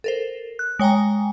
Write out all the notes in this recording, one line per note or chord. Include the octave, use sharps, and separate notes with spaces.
A4 A#4 C5
F#6
G#3 C#5 G5 G#5 A#5